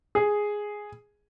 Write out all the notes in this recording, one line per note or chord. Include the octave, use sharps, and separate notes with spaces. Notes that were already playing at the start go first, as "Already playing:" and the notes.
G#4